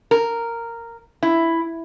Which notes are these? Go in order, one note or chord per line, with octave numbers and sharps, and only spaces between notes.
A#4
E4